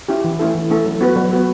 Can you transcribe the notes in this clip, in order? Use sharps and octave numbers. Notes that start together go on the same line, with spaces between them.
C#4 E4 G4
E3
A3 C#4 E4 A4
E3
A3 C#4 E4 A4
F#3
B3 F#4 B4
F#3
B3 F#4 B4